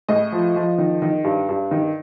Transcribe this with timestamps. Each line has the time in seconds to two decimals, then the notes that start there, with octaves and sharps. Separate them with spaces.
0.09 A2 D#5
0.32 F3
0.56 F3
0.78 D#3
1.02 D#3
1.24 G2
1.49 G2
1.71 D#3